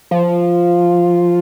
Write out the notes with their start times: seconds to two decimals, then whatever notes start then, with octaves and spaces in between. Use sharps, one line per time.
0.11 F3